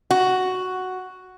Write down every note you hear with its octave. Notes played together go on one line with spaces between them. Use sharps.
F#4